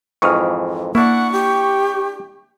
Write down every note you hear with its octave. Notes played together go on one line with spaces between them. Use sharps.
F2 G#2 E3 C#6 D#6 F6
A#3 D4 E4 F#5 C#6
G4